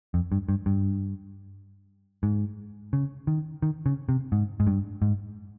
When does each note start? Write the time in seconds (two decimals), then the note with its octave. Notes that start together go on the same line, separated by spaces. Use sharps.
0.14 F2
0.32 G2
0.49 G2
0.66 G2
2.23 G#2
2.93 C#3
3.27 D#3
3.62 D#3
3.86 C#3
4.09 C3
4.32 G#2
4.60 G#2
4.67 G2
5.02 G#2